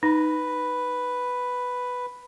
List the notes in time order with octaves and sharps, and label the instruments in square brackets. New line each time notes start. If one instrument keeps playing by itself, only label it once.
[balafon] D#4 [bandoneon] B4